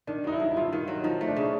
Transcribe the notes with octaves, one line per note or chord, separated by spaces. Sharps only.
D#3 D4
F#3 D#4
E4
G2
E4
G2 F4
D#3
F#3
F3 D#4
A3
D4
C#3